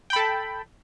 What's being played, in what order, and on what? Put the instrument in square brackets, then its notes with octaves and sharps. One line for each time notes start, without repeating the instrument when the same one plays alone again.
[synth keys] G5
B5
A4
A5